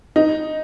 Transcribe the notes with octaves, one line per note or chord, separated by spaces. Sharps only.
D#4